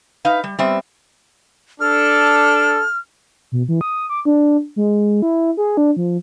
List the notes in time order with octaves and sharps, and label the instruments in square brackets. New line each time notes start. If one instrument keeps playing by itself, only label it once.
[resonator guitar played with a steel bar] D#4 B4 F5
G3
G3 B3 C4 E5
[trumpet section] D4 A4 [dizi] F6
[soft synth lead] B2
E3
D#6
D6
D4
G#3
E4
G#4
D4
F3